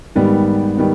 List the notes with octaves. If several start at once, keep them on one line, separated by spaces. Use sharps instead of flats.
G#2 D#3 G3 B3
D#3 G3 B3